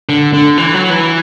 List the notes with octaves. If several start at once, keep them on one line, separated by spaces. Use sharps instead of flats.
D3
D3
E3
F#3
E3